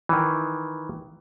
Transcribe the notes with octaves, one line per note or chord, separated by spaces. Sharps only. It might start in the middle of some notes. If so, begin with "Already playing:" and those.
D#3 E3